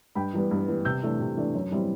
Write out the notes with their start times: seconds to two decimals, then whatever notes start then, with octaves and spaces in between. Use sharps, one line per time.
0.15 G2 G5 B5
0.33 E3 G3 B3
0.51 G2
0.68 E3 G3 B3
0.85 C3 E6 G6
1.03 E3 A3 D4
1.20 C3
1.37 E3 A3 D4
1.54 F#2
1.71 E3 G3 C4 E4